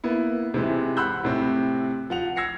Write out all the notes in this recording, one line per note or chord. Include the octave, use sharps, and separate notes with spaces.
A#3 B3 E4
C3 E3 G#3
F#5 B5 C6 E6 F#6 G6
A2 C3 C4
F3 F#5 F7
E6 G#6 A#6 C7 C#7